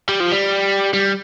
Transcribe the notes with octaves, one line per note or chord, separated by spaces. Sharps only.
G3
F3
G3
G3